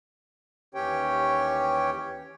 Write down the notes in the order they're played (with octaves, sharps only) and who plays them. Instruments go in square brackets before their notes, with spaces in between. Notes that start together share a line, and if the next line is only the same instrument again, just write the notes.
[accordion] D#2 E3 C#4 G4 C#5 G5